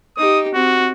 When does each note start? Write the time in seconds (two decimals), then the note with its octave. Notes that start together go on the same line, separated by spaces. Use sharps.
0.17 D#4 G4 D#6
0.54 C4 F#4